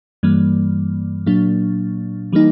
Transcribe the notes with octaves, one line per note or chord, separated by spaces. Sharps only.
G2 E3 G3 A#3
A#2 F#3 A#3 D4
E3 G3 A#3 D#4